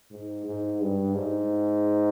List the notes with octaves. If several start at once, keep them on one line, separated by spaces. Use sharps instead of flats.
G#2
G#2
G2
G#2